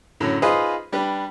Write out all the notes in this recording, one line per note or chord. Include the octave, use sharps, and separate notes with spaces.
F#2 A2 D3 F#3
D#4 F4 G#4 B4 C5 D#5
G3 D4 G4 B4